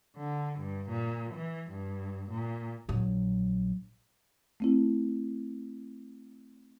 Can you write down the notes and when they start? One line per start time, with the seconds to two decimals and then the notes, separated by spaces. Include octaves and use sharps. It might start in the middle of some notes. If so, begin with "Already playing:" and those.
0.16 D3
0.59 G2
0.89 A#2
1.35 E3
1.71 G2
2.30 A#2
2.89 A#1 F#3
4.60 A3 C4 E4